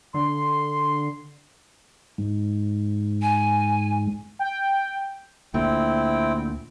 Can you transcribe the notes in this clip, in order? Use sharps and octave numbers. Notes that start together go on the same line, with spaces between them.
D3 C6
G#2
G#5
G5
D2 A#2 C4 E4 G5